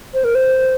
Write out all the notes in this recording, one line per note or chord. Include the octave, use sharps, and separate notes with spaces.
C5
A#4
C5